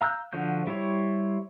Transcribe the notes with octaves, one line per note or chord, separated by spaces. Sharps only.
F5 A#5 E6 F#6 G6
D3 F3 F#4 G6
G3 E4 C5 C#5